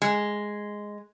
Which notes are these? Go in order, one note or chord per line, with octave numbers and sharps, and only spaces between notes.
G#3